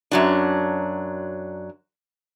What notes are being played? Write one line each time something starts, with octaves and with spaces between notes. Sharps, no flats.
F#2 F#3 D4